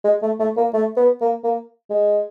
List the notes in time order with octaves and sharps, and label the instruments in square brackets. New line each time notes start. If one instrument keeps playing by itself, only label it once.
[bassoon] G#3
A3
A3
A#3
A3
B3
A#3
A#3
G#3